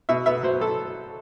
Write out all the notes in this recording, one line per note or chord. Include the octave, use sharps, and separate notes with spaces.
B2 E5
B3 E5
F#3 C5
F#3 A4